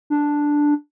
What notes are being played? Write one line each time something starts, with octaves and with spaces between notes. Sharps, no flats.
D4